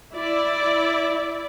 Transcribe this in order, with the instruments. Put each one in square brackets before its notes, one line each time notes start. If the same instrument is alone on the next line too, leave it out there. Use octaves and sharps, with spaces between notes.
[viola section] E4 D5